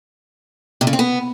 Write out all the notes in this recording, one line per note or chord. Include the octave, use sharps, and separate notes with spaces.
C3
C#3
C4
B3